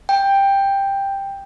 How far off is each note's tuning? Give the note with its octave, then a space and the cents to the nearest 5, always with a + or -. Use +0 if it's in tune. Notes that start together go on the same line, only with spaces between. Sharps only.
G5 +10